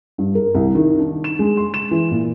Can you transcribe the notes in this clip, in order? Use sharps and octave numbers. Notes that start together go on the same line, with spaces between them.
G2
A#4
C2
D#3
D4
E7
G#3
C6
E7
E3
A#2